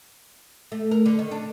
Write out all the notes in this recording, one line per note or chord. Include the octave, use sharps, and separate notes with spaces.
A3
A#4
D3
D#3
D4